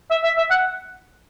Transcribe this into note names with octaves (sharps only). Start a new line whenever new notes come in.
E5
E5
E5
F#5